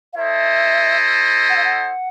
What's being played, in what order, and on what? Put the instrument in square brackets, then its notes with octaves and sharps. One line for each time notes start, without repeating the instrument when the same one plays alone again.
[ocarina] F5
[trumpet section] E4 A4 C5 D#5 [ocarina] E5
[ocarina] F#5
F5
F#5